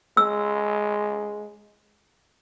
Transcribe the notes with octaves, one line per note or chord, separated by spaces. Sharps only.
G#3 E6